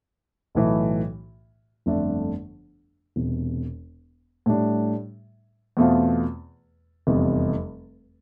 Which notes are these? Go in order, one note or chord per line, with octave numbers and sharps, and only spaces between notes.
B1 A2 E3 A3
G1 F2 D3 A3 D4
E1 E2 C3
A2 G3 D4
E2 B2 A3 C4 F4
F1 E2 C3 G3